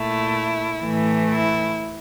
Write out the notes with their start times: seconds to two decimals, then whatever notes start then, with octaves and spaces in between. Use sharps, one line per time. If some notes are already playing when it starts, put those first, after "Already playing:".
Already playing: A#2 A3 E4
0.81 A2 E3 A3
1.30 E4